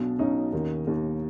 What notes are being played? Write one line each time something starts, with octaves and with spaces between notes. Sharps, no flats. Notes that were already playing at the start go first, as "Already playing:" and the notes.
Already playing: B1 B2 D4
B1 B2 C#4 D#4
D#2 D#3
D#2 D#3